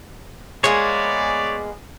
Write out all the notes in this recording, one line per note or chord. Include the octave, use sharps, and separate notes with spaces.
G#3 A#3 B3 G#4 B4 C#5 D5